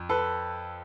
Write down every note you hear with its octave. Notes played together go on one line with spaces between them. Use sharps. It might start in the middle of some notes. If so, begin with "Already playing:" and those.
Already playing: F2
A4 B4